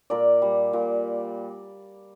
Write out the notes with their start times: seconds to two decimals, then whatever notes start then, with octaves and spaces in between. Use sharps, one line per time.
0.10 A#2 A#4 D5
0.42 G3
0.73 A#2